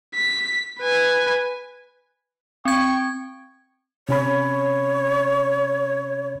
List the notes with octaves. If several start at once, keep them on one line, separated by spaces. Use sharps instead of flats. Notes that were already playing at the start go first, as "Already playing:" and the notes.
B6
B4 G#5
C4 G5 C#6 G#6
C3 C#4 C#5 B5